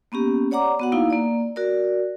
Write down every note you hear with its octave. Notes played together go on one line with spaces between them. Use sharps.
A#3 B3 C#4 G4
C#5 D5 F#5 A#5 D6
B3 F#4 F#5
A#3 D#4 E4 F5
A#3 D5
F#4 A#4 D5